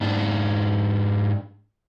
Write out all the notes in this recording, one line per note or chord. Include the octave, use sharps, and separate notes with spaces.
G#2 D4 D#4